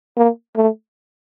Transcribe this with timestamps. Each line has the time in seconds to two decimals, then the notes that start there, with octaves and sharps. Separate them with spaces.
0.17 A#3
0.56 A3